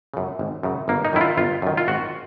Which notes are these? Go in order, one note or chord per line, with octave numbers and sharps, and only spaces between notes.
F#2 C#3
G#1
F#2 C#3
G1 A#3
D#4
F#2 D#3 E4
F4
G1 F4
F#2 D#3
F4
G#1 F#4